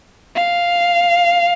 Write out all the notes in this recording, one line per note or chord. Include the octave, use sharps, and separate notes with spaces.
F5